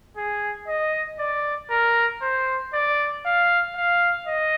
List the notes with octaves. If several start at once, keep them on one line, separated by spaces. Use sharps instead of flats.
G#4
D#5
D5
A#4
C5
D5
F5
F5
D#5